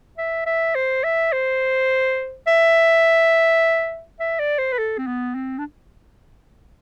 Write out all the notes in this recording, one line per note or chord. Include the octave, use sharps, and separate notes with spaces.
E5
E5
C5
E5
C5
E5
E5
D5
C5
B4
A4
C4
B3
C4
D4